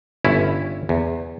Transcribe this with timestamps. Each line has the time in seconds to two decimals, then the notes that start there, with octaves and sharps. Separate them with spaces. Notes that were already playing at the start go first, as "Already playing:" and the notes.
0.25 G1 C#4 E4
0.89 E2